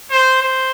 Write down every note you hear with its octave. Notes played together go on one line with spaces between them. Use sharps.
C5
C5